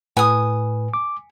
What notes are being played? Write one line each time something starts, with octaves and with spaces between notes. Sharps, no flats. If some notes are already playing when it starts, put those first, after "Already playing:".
A2 B4 G#5 D#6
D6